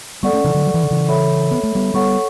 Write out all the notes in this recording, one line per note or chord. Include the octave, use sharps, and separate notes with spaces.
G3 B3 A4 D5 F#5 C#6
A3 C#4
C#3 E3
D3 F#3
F#3
E3
D3
C#3 E3
A4 C#5 E5 B5
B3
A3
G3 B3
G3 B3 A4 C#5 F#5 C#6